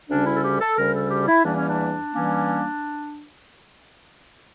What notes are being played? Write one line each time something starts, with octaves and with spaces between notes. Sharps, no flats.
D2 C#3 G3 C#4 D4
E4
A4
G4
A4
D2 C#3 G3 C#4 A#4
A4
G4
E4
E2 E3 G3 A#3 C#4 D4
C#4
D4
E3 G3 A#3 C#4